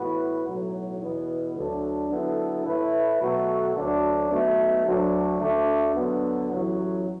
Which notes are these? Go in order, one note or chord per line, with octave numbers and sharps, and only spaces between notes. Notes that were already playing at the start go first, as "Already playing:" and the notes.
Already playing: A2 E3 B3 F#4 B4
B1 A2 F#3
E2 B2 B3
D2 D3 F#3 D4 A4
D3 F#3 B3 E4 A4
A2 A3 E4 B4
B2 F#3 A3 F#4 A4
D2 D3 F#3 D4
B1 B2 A3
D2 D3 F#3 D4
D2 D3 A3 D4
D2 D3 F#3 B3
A1 A2 F#3